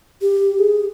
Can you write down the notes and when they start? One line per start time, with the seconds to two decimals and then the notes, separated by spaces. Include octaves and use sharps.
0.22 G4
0.59 G#4